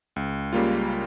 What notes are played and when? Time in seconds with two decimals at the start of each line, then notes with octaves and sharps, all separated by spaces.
0.16 C#2
0.53 C#3 G3 A#3 F4